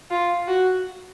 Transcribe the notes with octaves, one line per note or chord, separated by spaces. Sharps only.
F4
F#4